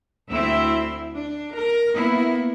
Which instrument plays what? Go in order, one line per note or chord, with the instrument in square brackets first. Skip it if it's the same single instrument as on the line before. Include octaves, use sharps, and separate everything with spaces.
[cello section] D2 C4 E4 E5
D4
A#4
A#3 B3 E4